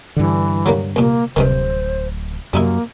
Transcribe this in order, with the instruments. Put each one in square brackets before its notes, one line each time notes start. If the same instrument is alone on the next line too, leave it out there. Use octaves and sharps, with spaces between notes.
[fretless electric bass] G2 D3 [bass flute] E3
[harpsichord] F#3 G3 A#3
[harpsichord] C2 A#2 [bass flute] A#3
[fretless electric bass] D1 [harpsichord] G2 C3 D#3 [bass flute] C5
[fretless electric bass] F#2 [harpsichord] G3 D#4 E4 [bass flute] A#3